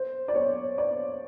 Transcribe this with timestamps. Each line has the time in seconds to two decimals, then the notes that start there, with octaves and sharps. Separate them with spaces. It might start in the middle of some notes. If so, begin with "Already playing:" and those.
Already playing: C5
0.28 D5
0.35 C#5
0.78 D5